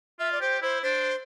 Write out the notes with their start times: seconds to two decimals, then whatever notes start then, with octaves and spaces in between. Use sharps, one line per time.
0.20 F4 E5
0.32 D5
0.41 G4 C5
0.62 E4 C5
0.83 D4 C5